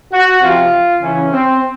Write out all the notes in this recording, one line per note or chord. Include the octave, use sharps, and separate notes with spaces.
F#4
C3 F3 F4
C#3 E3 C#4
C4